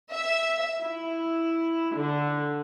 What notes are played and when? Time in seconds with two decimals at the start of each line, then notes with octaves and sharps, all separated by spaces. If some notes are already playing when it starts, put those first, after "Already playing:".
0.12 E5
0.82 E4
1.97 D3